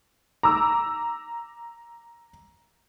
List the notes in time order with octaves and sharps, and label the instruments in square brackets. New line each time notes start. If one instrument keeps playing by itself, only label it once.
[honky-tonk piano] A#5 D6 E6